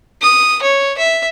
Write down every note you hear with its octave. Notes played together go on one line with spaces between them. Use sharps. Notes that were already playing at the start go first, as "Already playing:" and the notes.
D#6
C#5
E5